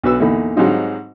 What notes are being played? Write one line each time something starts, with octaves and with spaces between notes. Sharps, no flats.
B1 F#4 B4 E6
E2 A#2 D3 D#4 B5
G#2 F#3 G3 C4 D#4 F4